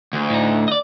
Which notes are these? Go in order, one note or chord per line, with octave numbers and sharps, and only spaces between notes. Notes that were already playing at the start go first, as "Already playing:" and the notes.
D2
A2 D#4
D5 D#5